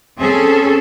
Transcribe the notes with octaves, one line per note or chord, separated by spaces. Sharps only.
C4 C#4 G#4 A4